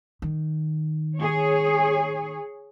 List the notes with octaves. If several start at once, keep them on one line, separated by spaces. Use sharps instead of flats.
D#3
G#4 C#5